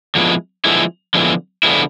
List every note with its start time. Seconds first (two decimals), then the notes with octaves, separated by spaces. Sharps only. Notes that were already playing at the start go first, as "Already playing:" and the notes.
0.15 D3 F3 G#3 B3 E4
0.65 D3 F3 G#3 B3 E4
1.14 D3 F3 G#3 B3 E4
1.63 D3 F3 G#3 B3 E4